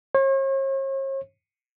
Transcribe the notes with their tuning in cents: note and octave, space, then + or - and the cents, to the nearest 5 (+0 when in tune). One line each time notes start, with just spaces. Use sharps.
C#5 -45